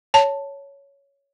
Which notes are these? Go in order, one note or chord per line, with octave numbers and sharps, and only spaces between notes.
C#5 A5